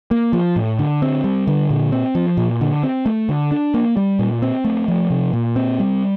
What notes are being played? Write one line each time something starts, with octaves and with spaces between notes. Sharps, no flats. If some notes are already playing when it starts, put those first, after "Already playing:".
A#3
F3
A2
D3
C4
G3
D3
A#2
C4
F3
A#2
D3
C4
A3
D3
D4
A#3
G3
A#2
C4
A3
F3
C3
A#2
C4
G3